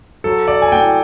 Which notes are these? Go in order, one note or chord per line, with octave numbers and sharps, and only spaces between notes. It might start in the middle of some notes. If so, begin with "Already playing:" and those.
F#3 A4
D5
G#5
A2 G5